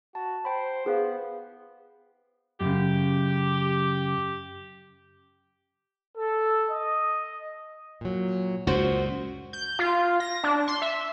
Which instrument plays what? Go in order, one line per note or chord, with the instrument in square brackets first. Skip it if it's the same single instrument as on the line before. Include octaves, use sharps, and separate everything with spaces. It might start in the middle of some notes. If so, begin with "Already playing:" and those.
[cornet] F#4 [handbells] A5
[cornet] C5 [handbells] G5 B5
[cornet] B3 [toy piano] G#4 C5 F5
[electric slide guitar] F#2 C#3 [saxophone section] G4
[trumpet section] A4
D#5
[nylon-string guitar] A#2 F#3
[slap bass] C#2 F#2 A#2 [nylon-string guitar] F#4 C5
[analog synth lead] G6
F4
A#6
D4
C6
E5